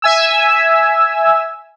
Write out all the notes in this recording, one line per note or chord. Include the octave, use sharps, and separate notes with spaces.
E5 G#5 E6